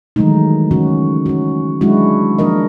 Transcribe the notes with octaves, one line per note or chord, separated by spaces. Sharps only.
D#3 E3 F#3 G#3 A3 D#4
C#3 C#4 F#4
C#4 F#4
F#3 G#3 D4 E4 F#4
F3 A#3 D4 A#4 D#5